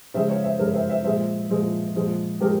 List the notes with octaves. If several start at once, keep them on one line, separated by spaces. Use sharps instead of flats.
C#3 F3 G#3 C5 E5
C#5 F5
C5 E5
C#3 F3 G#3 A#4 C#5
C5 E5
C5 E5
A#2 F3 G#3 C5 E5
A#2 F3 G#3
A#2 F3 G#3
A#2 F3 G#3 G4 A#4